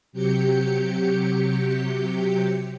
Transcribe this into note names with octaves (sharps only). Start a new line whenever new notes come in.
C3 F#3 G4 G6 C#7